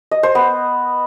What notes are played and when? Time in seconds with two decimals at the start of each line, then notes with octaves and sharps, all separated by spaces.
0.11 D#5
0.23 C5
0.35 B3